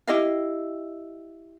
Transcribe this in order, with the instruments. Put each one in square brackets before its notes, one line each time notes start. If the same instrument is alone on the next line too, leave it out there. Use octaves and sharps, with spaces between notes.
[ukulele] E4 G4 D#5 F5